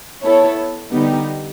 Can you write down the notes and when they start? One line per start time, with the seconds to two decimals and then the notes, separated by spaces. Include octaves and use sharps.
0.22 B3 E4 A4 C#5
0.92 D3 G3 B3 D#4 G4